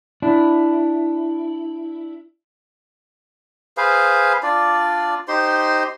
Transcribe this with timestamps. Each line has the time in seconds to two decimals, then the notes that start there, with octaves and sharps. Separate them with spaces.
0.22 D4 E4
3.77 G#4 B4 C5 F5
4.43 D4 F4 D5
5.28 D#4 G4 C5 C6